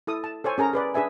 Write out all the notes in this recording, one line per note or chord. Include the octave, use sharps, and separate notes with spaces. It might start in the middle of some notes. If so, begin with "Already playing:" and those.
E4 A4 D#6
A5
A4 C5 C#5 G#5
C#4 G#4 A#4 A#5
G#4 B4 D5
D4 G#4 B4 E5 G#5